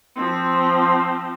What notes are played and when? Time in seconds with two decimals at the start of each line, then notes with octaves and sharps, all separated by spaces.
0.16 F3 C4